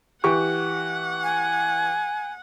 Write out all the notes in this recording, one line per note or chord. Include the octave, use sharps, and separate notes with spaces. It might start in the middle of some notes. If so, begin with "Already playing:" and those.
E3 G4 F#5 C#6
G#5